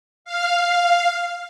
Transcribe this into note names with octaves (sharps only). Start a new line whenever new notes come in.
F5